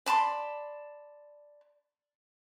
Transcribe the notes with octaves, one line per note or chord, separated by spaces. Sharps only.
D5 A5 B5 C6